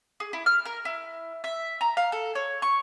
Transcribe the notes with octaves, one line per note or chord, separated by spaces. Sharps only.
G#4
E4
F6
A#4
E4
E5
A#5
F5
A4
C#5
C#6